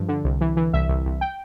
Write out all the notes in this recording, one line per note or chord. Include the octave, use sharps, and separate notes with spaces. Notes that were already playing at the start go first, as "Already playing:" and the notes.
Already playing: G2 F3
D3
C2
E3
E3
C2 E5
C2
C2
G5